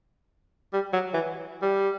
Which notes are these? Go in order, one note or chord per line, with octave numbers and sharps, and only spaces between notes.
G3
F#3
E3
G3